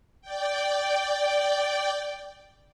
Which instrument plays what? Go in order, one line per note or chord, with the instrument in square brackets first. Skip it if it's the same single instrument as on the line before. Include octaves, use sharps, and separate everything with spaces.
[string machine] D5 G5